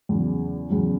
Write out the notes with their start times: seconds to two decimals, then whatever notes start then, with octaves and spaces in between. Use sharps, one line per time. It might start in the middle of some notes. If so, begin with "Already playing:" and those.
0.09 E2 C#3 F#3
0.70 E2 C#3 F#3